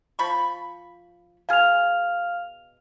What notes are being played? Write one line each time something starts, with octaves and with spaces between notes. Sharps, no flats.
F3 B5 C#6
B2 G#4 F5 F6 F7